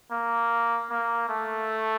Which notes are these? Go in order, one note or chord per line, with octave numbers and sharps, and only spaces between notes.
A#3
A#3
A3